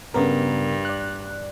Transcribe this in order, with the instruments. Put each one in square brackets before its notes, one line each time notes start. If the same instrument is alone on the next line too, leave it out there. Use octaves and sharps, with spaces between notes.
[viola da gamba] G2 [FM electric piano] C#3 B3 A#4
[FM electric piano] D5 F#6